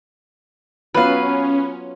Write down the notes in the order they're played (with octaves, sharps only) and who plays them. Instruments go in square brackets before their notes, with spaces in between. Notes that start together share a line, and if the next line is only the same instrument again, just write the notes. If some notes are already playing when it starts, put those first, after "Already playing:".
[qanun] F#3 B3 F4 [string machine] C#4 [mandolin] B4 F5